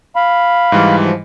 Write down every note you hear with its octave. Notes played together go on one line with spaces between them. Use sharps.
F5 B5
G#2 E3 G3
F3